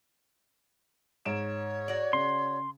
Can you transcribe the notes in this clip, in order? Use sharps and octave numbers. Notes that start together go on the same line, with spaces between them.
G#2 C#5 D7 E7
F#4 D5
C#3 C6